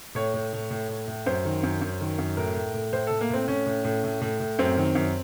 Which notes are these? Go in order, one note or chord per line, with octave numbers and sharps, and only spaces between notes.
A2 C#5
A2
A2
A2
A2
A2
F#2 C5
D#3
F#2
F#2
D#3
F#2
A2 A#4
A2
A2
A2 C5
A2 A4
A#3
A2 C4
A2 C#4
A2
A2
A2
A2
A2
F#2 C4
D#3
F#2